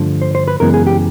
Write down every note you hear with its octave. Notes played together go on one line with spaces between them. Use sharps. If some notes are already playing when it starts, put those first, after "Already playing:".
Already playing: G2 D3 F3 A3
C5
C5
B4
F#2 C#3 E3 G#3 B3 A#4
G#4
G4